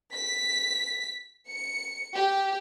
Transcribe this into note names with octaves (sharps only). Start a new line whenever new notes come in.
B6
C#7
G4